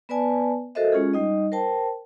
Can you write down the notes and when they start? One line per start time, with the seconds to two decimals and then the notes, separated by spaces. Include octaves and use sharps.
0.09 B3 B4 D5 G#5 A5
0.75 F#4 A4 A#4 C5 D#5 E5
0.92 G#3 C#4 F4 G#4
1.13 G3 D#4 D#5
1.52 A#4 C5 G5 A5